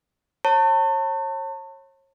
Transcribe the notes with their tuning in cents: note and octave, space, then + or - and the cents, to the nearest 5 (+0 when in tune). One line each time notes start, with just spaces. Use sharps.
C#5 -35 A5 +35